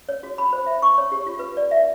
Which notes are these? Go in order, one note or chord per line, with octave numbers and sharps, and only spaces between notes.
C#5
F#4
B5
C5
E5
C#6
C#5
G4
F4
B4
D5
E5